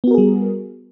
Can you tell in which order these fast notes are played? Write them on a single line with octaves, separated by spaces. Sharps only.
B3 F#4 A#4 G#4 G3